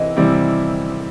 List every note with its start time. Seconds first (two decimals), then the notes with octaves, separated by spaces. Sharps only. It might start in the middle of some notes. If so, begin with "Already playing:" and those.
Already playing: C3 E3 C4 E4 D#5
0.16 C3 E3 G3 C4 E4